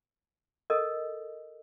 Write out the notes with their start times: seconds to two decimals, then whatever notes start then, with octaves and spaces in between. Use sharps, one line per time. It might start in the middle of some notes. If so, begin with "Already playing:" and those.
0.70 A4 A#4 D#5